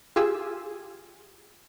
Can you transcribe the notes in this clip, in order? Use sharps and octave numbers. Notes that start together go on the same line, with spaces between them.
F4 G4 G#4 G#5 E6